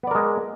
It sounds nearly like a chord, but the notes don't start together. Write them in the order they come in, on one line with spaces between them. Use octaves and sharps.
B3 D5 A#4 G#3